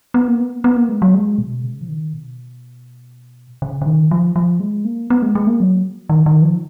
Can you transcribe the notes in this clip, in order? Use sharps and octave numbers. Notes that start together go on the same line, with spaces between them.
B3
A#3
B3
B3
A#3
G#3
F#3
G#3
B2
C#3
F3
D#3
B2
C#3
C#3
D#3
F3
F3
G#3
A#3
B3
G#3
G#3
A#3
F#3
D#3
D#3
F3